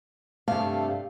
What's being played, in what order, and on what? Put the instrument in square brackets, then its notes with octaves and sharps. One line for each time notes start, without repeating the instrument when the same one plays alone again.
[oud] G2 C3 [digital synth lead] A3 [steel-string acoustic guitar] F5